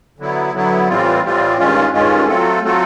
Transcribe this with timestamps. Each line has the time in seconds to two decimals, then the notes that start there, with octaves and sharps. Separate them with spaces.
0.19 D3 F#3 B3 E4
0.53 D3 F#3 B3 E4
0.89 A2 E3 G3 C4 F4
1.23 A2 E3 G3 C4 F4
1.58 G2 D#3 G#3 C#4 F4
1.92 G2 D#3 G#3 C#4 F4
2.27 F#3 A3 C4 F4 A4
2.62 F#3 A3 C4 F4 A4